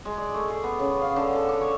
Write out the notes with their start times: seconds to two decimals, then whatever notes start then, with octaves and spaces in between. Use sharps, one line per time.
0.05 G#3
0.18 D5
0.34 A3
0.50 G#4
0.64 B3
0.79 C#3
1.02 F5
1.16 D3
1.35 A4
1.49 D4
1.61 C#5